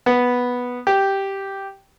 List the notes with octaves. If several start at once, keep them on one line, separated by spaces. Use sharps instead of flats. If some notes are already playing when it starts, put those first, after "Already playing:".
B3
G4